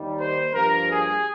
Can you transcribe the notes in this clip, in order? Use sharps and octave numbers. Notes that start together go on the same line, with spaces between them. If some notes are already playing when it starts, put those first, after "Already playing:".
Already playing: D#2 D#3 G3
C5
G2 F3 A#3 A#4
G#4